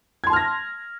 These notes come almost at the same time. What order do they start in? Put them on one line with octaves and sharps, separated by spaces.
G#6 C6 A5 F6 A#6